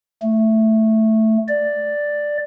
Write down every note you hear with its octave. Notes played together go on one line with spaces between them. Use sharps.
A3
D5